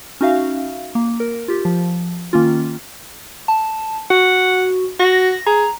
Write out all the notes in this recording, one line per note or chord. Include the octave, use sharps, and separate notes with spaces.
C#4 D#4 F#4 E5 F5
A#3
A#4
F4 G4
F3
D#3 A#3 C#4 F4
A5
F#4 F#5
F#4 A#6
G#4 A#5